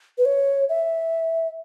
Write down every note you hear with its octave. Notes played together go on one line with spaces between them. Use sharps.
B4
C#5
E5